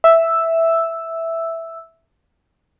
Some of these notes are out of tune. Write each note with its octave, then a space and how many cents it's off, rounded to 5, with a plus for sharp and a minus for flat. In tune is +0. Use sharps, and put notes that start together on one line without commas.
E5 +0 E6 +0